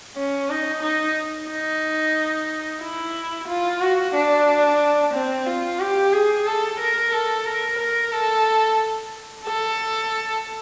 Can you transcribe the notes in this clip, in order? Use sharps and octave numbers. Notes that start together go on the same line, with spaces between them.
C#4
D#4
D#4
D#4
E4
F4
F#4
D4
C4
F4
G4
G#4
A4
A#4
A4
A#4
A#4
A4
A4